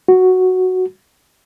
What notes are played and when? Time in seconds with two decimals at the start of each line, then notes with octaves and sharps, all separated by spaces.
0.08 F#4